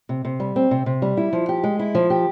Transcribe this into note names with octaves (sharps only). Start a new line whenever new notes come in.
C3
C3
G3
C4
C3
C3
G3
E4
F3
G4
G#3
E4
F3
G4